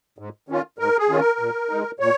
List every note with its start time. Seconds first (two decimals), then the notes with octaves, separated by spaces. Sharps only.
0.19 G#2
0.49 D#3 C#4 F4
0.78 G#2 A#4
0.98 G#4
1.09 D#3 C#4 F4
1.19 A#4
1.39 A#2
1.70 G#3 D#4
2.00 A#2 C#5